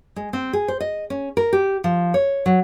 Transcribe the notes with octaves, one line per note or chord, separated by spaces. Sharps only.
G#3
C4
G#4
C5
D#5
C#4
A#4
G4
F3
C#5
F#3